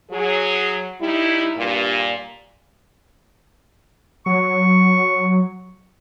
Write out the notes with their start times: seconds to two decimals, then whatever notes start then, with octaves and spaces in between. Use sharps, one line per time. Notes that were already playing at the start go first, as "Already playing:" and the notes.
0.11 F#3 G#4
1.01 G3 D#4 E4
1.56 G2 A#2
4.26 F#3 C#6